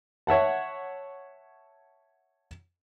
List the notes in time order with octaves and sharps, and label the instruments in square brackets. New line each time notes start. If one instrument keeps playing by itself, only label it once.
[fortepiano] C#5 E5 F#5 A5